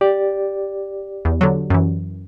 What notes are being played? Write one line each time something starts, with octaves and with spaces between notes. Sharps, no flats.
G4 D5
E2
D3 F#3
F#2 E3